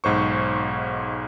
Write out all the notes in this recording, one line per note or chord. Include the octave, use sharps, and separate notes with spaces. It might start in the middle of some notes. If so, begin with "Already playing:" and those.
B1 G#2 C5 C#6